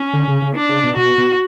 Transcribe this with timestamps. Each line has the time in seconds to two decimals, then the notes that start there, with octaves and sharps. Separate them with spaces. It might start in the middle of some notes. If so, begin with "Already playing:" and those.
Already playing: C#4
0.13 D3
0.28 C#3
0.42 C#3
0.55 D4
0.69 C#3
0.84 B2
0.96 B2 F#4
1.18 B2